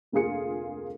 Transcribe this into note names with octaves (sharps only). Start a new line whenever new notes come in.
F1 D2 A#3 F4 G#4 C#7